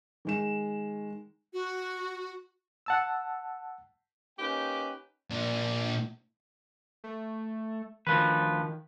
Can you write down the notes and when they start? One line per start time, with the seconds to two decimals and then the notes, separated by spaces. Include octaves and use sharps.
0.25 D#3 G#3 E7
1.53 F#4
2.86 F#5 A5 E6
4.39 A#3 C#4 D#4 G4 B4 G5
5.30 A#2 D4
7.04 A3
8.07 D2 D#3 F3 B4